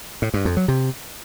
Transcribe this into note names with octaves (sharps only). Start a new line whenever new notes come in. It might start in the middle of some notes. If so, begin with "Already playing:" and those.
A2
G2
F2
F#3
C3